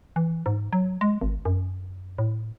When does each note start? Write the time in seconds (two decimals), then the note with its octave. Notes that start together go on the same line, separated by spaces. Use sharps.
0.16 E3
0.46 G#2
0.73 F#3
1.01 G#3
1.21 G#1
1.45 F#2
2.18 A2